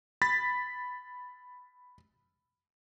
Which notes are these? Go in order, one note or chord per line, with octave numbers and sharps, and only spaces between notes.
B5 A6 B6